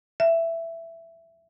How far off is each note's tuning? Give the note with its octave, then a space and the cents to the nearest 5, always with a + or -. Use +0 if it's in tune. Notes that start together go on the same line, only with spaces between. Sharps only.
E5 +10